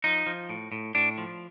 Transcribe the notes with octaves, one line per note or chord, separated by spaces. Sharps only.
F3 D#4
F3
A2
A2
A2 D4
F3